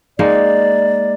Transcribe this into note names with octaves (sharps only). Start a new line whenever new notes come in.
G#3 A#3 D#4 D5